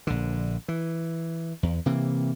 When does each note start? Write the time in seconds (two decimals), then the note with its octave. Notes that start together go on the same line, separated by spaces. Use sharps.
0.07 A#1 D3
0.68 E3
1.63 E2
1.86 C3 E3 A#3